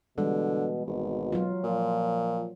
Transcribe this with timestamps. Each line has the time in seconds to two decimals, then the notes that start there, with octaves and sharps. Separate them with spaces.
0.18 B2 D3 E3 G3 G#3
0.86 G#1 B2
1.32 F#3 F4
1.64 A#2 F3